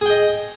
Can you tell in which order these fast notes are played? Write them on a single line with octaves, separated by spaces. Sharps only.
G#4 G5 D#5